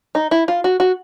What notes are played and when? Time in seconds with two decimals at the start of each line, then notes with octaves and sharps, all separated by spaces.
0.15 D#4
0.31 E4
0.48 F4
0.64 F#4
0.80 F#4